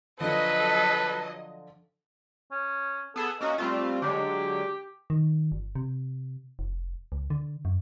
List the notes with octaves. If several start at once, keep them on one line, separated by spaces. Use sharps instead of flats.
D3 F3 F#3 A4 B4 D#5
C#4
B3 G#4 A4
A#3 C#4 F#4 D#5
G3 A3 C4 F4
D3 F#3 G#3 G4
D#3
G1
C3
F1
C#2
D3
F#2